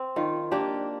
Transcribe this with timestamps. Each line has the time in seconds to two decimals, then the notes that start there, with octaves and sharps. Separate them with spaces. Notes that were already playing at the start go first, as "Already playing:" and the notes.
Already playing: C4
0.16 D#3 F4
0.51 A#3 D4 G4